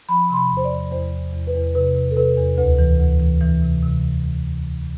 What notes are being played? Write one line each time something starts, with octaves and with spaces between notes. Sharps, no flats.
F3 B5
C3 C6
B5
E2
C5
D5
E2
E2 C5
E2
E2
B4
E2
C3 B4
C3
A4
C3 B4
E2
D2 B4
E3
D2
E3
E3
C3
C3